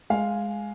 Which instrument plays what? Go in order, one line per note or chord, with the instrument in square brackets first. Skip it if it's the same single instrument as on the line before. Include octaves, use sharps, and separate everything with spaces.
[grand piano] G#3 F5 G#5